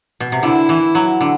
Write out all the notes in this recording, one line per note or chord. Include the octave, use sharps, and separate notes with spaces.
B2
C3
D3 E4
E3
F#3
D3